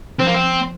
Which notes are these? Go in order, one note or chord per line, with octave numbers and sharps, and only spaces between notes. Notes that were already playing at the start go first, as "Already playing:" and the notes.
F3 C4
A#3
C4